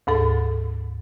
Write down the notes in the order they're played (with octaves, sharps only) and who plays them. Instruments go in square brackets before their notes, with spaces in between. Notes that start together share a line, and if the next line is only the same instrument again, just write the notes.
[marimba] D2 G#2 A4